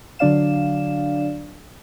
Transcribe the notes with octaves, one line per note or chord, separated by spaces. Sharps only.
D3 F#3 D4 D5 F5 E7